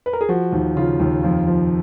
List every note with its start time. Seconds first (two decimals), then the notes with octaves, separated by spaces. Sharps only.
0.06 B4
0.13 A#4
0.21 G#4
0.29 F3 F#4
0.52 D#2
0.76 C#3 F4
1.00 D#2
1.23 F2 F4
1.47 F3